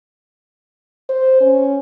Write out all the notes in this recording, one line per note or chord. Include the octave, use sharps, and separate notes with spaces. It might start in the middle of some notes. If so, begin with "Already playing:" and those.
C5
C#4